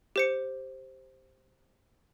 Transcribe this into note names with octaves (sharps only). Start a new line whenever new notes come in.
G4 C5 C#7